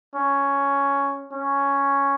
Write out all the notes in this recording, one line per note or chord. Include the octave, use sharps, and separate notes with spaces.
C#4
C#4